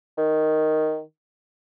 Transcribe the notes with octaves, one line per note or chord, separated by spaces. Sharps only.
D#3